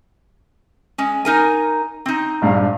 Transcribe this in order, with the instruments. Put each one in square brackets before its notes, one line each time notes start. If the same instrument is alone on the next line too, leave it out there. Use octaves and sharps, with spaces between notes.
[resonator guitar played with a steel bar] G#3 C#4
D#4 A#4 G#5
C4 D#4
[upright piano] A#1 G2 F5